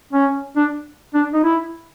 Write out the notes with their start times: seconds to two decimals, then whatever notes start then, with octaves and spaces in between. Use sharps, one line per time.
0.13 C#4
0.57 D4
1.14 D4
1.34 D#4
1.44 E4